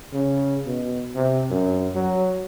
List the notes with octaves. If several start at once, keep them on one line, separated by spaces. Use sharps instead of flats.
C#3
B2
C3
F#2
F#3